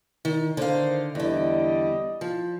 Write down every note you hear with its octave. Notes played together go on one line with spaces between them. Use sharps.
D#3
D3 D#3 C5 F5
E2 D3 G3 D5 D#5
F3